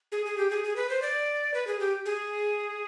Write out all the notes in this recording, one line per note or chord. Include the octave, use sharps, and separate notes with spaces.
G#4
G#4
G4
G#4
G#4
B4
C5
D5
B4
G#4
G4
G#4